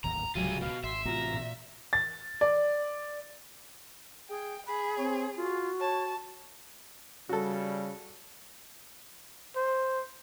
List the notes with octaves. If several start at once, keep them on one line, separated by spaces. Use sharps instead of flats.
D1 G#1 D#2 A#5
D1 C#2 C3 F#3 G3 F4 G#4 D#7
B2 F#4 F5
G#1 E5 C6
A1 A2 C3 F4 F#4 A#5
A#2
A6
D5
G#4 G5
G#4 B5
C4 C#5
F4 F#4
C#5 A5
C#3 G3 F#4 A4
C5